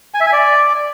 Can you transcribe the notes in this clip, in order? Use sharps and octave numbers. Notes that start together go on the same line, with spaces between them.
G#5
E5
G#5
D5